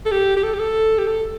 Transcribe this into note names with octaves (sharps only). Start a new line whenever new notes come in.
A4
G4
G4
A4
G4
A4
G4
A4